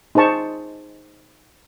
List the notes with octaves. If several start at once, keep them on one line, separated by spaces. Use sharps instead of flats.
D#4 G#4 C5 A5 C#6